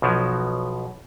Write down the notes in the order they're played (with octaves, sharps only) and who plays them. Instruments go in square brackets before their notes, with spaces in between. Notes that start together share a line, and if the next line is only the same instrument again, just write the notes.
[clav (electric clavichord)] B1 B2 F3 F#3